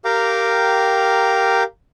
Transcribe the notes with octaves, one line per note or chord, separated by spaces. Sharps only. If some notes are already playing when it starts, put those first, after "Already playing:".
G4 A#4 F5 G5 A#5 D6